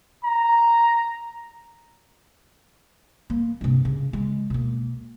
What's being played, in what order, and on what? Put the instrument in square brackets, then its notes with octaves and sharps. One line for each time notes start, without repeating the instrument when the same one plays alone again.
[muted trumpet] A#5
[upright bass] A#3
G2 C3
C#3
G#3
B2 A#3